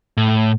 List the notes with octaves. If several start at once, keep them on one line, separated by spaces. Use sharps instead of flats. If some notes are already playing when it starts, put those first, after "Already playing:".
A2